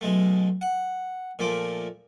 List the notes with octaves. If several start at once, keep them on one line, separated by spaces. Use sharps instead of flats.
B1 G#3 A3
F#5
A#2 F3 A3 D6